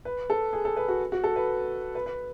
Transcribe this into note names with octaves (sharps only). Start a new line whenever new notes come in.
B4
A4
G#4
A4
B4
F#4
F#4
A4
B4
B4
B4